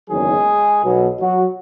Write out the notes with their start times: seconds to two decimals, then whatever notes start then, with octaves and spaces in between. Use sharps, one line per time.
0.09 F#1 E2 D#3 F#3 G#3 G#4
0.83 B1 B2 F#3
1.20 F#3 F#4